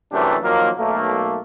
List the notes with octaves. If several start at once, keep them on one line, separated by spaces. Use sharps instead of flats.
F#2 C3 E3 A3 D4 G4
D#3 F3 F#3 A#3
B1 A3 A#3